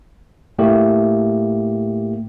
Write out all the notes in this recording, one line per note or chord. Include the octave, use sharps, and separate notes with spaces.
A2 A3 A#3 G4